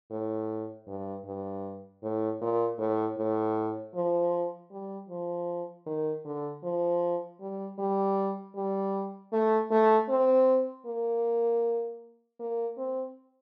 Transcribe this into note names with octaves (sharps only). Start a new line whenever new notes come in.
A2
G2
G2
A2
A#2
A2
A2
F3
G3
F3
D#3
D3
F3
G3
G3
G3
A3
A3
C4
A#3
A#3
C4